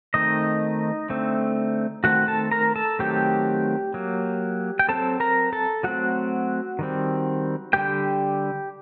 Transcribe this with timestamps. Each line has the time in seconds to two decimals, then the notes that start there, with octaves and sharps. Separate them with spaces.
0.14 D#3 A3 C4 D#4 D#5
1.09 D3 A3 C4
2.04 D#3 A3 C4 F#4 F#5
2.28 A4 A5
2.52 A#4 A#5
2.76 A4 A5
2.99 D#3 F#3 A3 C4 G4 G5
3.94 F#3 A#3
4.79 G5
4.89 F#3 C4 A4 A5
5.20 A#4 A#5
5.53 A4 A5
5.83 F#3 A3 C4 F#4 F#5
6.79 D#3 G3 C4
7.73 D3 G3 A#3 G4 G5